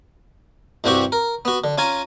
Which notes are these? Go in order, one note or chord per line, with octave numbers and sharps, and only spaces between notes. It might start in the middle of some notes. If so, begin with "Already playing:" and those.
C2 G2 C4 F#4 G4 C#6
A#4
B3 F#4
D3
C#4 F4 G#5 A#5